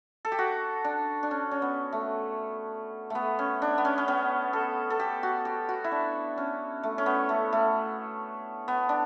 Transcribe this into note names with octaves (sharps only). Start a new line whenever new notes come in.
A4
G4
F#4
D4
D4
C#4
C#4
B3
A3
A3 B3
C#4
D4
B3
C#4
C#4
B3
A4
A4
G4
F#4
G4
F#4
E4
D4
C#4
A3
C#4
B3
A3
A3
B3
D4